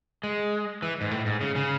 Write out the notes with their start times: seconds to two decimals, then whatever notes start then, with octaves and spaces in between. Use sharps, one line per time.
0.23 G#3
0.82 E3
1.01 G#2
1.11 A2
1.26 G#2
1.41 C#3
1.56 C#3